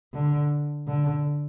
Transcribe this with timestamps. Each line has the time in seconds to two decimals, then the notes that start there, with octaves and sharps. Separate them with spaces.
0.13 D3
0.87 D3